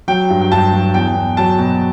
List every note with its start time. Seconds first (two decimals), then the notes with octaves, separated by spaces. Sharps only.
0.08 F#3 G5
0.30 G2
0.41 G5
0.52 G2 A5
0.73 F#3
0.94 E2 G5
1.15 E2
1.37 F#3 A5
1.58 B2